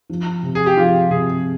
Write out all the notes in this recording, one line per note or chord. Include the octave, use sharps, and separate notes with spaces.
F3
C3
G#4
G4
F3 F4
C3 G#4